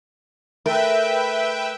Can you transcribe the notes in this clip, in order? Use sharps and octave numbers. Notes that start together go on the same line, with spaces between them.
A3 A#4 B4 E5 G5